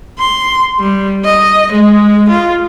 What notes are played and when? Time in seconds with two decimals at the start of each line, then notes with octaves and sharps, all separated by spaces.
0.19 C6
0.80 G3
1.25 D#5
1.72 G#3
2.29 F4